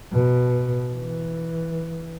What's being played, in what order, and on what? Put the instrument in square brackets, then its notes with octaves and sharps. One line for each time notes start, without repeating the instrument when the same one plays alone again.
[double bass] B2
E3